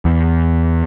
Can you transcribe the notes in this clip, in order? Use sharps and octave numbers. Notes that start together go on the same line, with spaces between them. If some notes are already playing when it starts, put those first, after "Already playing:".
E2